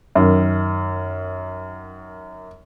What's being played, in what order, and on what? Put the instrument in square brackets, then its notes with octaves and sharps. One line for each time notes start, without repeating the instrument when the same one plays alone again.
[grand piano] F#2 D#3